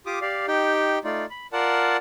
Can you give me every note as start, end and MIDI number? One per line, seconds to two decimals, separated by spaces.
0.06 0.19 65
0.06 0.19 67
0.06 0.19 86
0.06 0.19 87
0.21 0.46 67
0.21 0.46 74
0.21 0.46 77
0.48 0.99 63
0.48 0.99 67
0.48 0.99 79
1.04 1.26 57
1.04 1.26 63
1.04 1.26 65
1.04 1.26 74
1.30 1.47 83
1.53 1.97 65
1.53 1.97 70
1.53 1.97 74
1.53 1.97 78
1.53 1.97 81